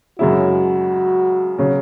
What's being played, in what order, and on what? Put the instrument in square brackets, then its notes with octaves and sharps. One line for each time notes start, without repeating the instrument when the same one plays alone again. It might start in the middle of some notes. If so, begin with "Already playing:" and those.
[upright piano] F#2 C#3 G#3 E4 [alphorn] F#4
[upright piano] C#3 F#3